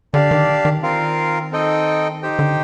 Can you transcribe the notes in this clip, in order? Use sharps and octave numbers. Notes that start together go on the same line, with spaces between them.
D3 D4 G4 D5 F5
D#3
D#3
C4 F4 A#4 F5
C4 D#4 A4 D#5 G5
D#4 G4 C5 G5
D3